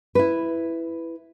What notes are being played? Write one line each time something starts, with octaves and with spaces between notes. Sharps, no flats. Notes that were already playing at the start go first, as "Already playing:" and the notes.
E4 B4